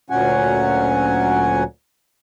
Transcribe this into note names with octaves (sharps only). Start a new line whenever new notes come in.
D2 A#2 F#3 C#4 F#5 G#5